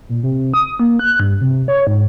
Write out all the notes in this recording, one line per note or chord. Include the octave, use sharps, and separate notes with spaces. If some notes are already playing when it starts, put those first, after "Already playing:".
A#2
C3
D#6
A#3
F#6
G2
C3
C#5
G#2